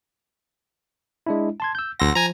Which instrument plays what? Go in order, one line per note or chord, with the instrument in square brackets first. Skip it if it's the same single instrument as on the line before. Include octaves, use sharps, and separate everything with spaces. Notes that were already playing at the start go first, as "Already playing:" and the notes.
[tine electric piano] G#3 D4 E4
A5 C6 G#6
E6 G6
[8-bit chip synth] D2 A#6 [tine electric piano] F#5 C6 E6
[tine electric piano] F3 [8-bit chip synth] G#5 A#5